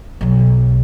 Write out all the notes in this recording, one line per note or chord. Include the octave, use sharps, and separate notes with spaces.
B1 F#3